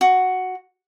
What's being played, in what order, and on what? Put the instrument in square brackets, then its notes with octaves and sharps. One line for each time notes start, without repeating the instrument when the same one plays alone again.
[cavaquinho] F#4